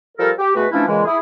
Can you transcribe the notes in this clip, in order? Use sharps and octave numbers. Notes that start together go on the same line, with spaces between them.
F3 G3 A4 A#4
G4
B2 G#3 A3 F#4 B4
E3 F3 A3 C#4 D4 E4
A#2 C#3 E3 G#3
E4 G#4